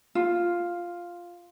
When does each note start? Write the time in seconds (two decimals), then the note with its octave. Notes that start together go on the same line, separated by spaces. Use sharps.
0.15 F4